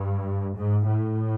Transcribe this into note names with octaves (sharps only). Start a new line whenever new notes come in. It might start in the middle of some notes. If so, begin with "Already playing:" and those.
Already playing: G2
G#2
A2